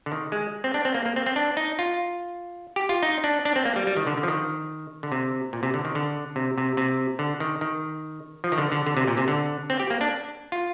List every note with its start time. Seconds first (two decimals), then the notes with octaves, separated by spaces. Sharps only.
0.06 D3
0.12 D#3
0.32 G#3
0.64 C4
0.74 D4
0.85 C4
0.94 A#3
1.06 A#3
1.16 C4
1.26 C4
1.36 D4
1.57 D#4
1.79 F4
2.76 G4
2.89 F4
3.03 D#4
3.24 D4
3.45 D4
3.56 C4
3.65 A#3
3.76 G3
3.87 G3
3.97 D#3
4.07 D3
4.17 D3
4.23 F3
4.28 D#3
5.03 D3
5.12 C3
5.53 A#2
5.63 C3
5.74 D3
5.85 D#3
5.95 D3
6.36 C3
6.58 C3
6.77 C3
7.19 D3
7.40 D#3
7.61 D#3
8.44 F3
8.52 D#3
8.58 D3
8.72 D3
8.87 D3
8.97 C3
9.08 A#2
9.17 C3
9.28 D3
9.70 C4
9.80 G4
9.90 A#3
10.01 D4
10.52 F4